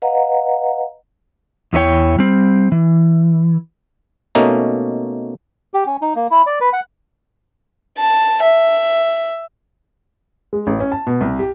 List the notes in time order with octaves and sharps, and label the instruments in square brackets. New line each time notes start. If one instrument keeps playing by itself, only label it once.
[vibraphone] B4 D#5 F5 F#5 A#5
[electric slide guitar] E2 E3 D#4 C#5 G5
G3 C4
E3
[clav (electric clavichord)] B2 A3 A#3 C#4 D#4
[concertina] G4
C#4
D#4
A#3
E4
D5
B4
F#5
[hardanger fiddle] A5
E5
[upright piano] G#3
A1
C#4
A5
B2
C2
G4